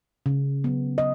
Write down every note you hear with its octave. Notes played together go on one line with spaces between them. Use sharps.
C#3
F#3 B3
D#5